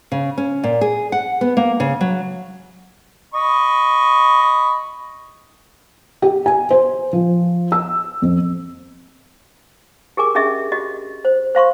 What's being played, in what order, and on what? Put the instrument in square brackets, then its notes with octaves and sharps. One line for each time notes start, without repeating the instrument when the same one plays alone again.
[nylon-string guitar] C#3
C#4
A#2
G#4
F#5
B3
A#3
C#3
F#3
[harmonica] D#5 B5 C#6
[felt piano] G4
G#5
C5
F3
E6
F2
[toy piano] G4 G#4 A#4 G#5 D6
C#4 D4 G4 G#4 D#5 E5
F#4 G4 D#5
C5
C5 F5 C6 C#6